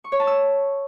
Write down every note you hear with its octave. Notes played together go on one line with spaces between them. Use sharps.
C#6
C#5
A5
E6